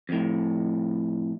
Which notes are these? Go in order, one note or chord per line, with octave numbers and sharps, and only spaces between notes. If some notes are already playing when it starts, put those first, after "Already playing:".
F2 A2